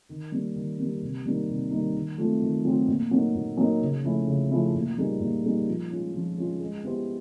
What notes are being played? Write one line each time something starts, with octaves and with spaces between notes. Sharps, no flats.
D#3
G3 A#3
D#3
G3 A#3
C3
D#3 G3 A#3 D#4
C3
D#3 G3 A#3 D#4
D#3
F#3 A3 C4 F4
D#3
F#3 A3 C4 F4
A#2
F#3 A#3 D#4 F#4
A#2
F#3 A#3 D#4 F#4
C#3
F3 A3 C#4 E4
C#3
F3 A3 C#4 E4
A#2
G3 A#3 D#4 G#4
A#2
G3 A#3 D#4 G#4
F3
G#3 C#4 F4
F3
G#3 C#4 F4
G#3
B3 E4 G4 C5